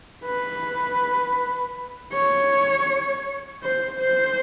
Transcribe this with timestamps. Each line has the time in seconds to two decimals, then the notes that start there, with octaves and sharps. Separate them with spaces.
0.25 B4
2.13 C#5
3.62 C5
3.99 C5